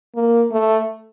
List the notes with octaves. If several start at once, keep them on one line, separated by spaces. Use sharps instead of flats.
A#3
A3